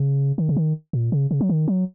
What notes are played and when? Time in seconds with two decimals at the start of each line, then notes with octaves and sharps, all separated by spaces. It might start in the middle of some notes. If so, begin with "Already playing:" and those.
Already playing: C#3
0.38 D#3
0.49 C#3
0.57 D#3
0.93 A#2
1.12 C#3
1.31 C#3
1.41 F#3
1.49 D#3
1.68 F#3